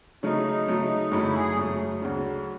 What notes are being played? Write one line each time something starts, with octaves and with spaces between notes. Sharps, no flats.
C#3 F#3 A3 D#4
C#3 F#3 A3
F#2 C#3 F#3 A3 E4
G#4
F#2 C#3 F#3 A3
D2 C#3 F#3